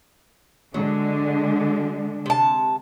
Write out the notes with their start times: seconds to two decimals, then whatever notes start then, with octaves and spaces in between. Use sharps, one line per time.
0.74 D3 F#3 G#3 D4
2.26 C3 A5